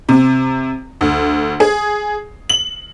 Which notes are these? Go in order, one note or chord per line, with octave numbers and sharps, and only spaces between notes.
C3
D2
G#4
F#7